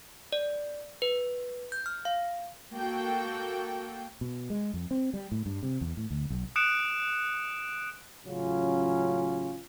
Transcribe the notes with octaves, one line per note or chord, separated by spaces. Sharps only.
D5
B4
G6
F6
F5
A#3 F#4 A4 G5
B2
G#3
F2
C4
G3
A2
G2
C3
E2
A2
D2
B1
D#6 F#6 C#7 D7 E7
A1 C#3 F#3 C#4 F4